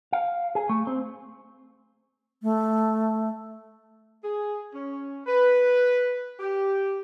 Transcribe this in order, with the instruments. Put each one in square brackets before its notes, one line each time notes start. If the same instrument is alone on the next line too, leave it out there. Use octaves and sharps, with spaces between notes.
[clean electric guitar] F5
G#4
A3
C4
[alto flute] A3
[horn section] G#4
C#4
B4
G4